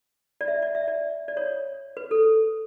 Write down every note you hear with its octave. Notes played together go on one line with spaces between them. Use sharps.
D5
E5
D5
E5
D5
D5
C#5
B4
A4